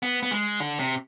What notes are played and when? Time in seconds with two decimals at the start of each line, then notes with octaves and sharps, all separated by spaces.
0.03 B3
0.23 B3
0.31 G#3
0.60 D3
0.79 C3